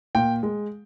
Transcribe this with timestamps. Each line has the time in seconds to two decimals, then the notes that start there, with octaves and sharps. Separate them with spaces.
0.15 A#2 G5
0.43 G#3